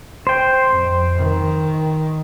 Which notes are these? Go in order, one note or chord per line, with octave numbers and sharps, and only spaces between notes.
C5 G5
F2
D#3